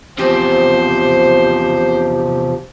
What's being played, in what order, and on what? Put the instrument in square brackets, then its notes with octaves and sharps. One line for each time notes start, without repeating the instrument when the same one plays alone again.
[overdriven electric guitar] E2 C3 [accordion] F3 [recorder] G4 [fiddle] C5